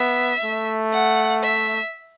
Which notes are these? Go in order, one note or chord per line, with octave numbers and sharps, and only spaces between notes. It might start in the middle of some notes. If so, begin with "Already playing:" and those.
Already playing: B3 E5
A3
F#5
E5